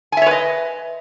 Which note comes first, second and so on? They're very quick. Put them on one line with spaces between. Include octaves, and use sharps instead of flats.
G#5 E5 C#5 B4 D#5